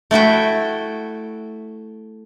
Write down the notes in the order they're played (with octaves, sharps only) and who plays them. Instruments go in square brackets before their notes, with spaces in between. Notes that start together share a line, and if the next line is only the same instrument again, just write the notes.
[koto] A3 E4 F#4 G5